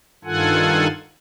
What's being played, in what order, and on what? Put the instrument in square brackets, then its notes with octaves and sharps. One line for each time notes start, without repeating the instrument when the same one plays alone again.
[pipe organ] G2 D#3 F4 A4 F#5 G#5